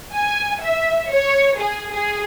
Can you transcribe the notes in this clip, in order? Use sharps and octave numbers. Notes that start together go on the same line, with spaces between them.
G#5
E5
C#5
G#4
G#4